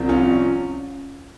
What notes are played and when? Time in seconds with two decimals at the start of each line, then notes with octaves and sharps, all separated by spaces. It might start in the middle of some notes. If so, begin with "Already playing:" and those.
Already playing: C2 C3 F3
0.09 C#4 F4